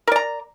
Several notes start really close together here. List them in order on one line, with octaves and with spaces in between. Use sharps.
A#4 D5 A#5